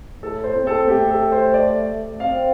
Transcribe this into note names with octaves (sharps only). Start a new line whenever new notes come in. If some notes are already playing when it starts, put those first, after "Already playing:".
A2 A4
C5
C4
A4
A3 G4
A4
C5
D5
C4 F5